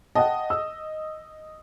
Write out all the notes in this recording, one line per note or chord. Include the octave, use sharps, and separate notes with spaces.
D#5 F#5 G5 A5
E6